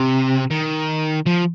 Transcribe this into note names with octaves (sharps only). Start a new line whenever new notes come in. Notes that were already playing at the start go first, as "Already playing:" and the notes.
Already playing: C3
D#3
F3